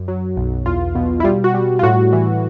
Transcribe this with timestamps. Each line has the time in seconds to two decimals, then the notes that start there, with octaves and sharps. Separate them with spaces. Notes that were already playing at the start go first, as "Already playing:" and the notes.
Already playing: F#2
0.08 F#3
0.37 B1
0.66 E2 F4
0.95 B2
1.20 E4
1.24 G3 F4
1.44 F#4
1.54 G3
1.79 F4
1.83 A2 F#4
2.13 E3